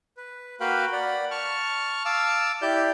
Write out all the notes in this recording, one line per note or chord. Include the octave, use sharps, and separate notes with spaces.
B4
A#3 F#4 B4 F5 G5 B5
D5 F#5 B5
A5 C#6 F6
F5 A5 D6 E6
E4 G4 D5 G6